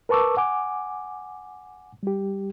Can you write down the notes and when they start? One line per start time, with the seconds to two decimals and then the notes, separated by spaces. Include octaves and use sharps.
0.09 A#4 B4 A5 C#6 D6 E6
0.37 F#5 G#5 D6
2.03 G3 G4